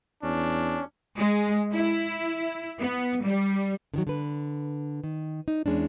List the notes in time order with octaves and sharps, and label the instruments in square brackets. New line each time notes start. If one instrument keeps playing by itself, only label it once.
[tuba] E2 [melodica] C#4 [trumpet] D4
[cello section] G#3
E4
B3
G3
[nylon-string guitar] D3 D#3 F#3
D3 B4
D#3
D#4
E2 G#3 C#4 D4